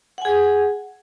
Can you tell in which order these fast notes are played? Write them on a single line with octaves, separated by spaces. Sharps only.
F#5 G#5 G#4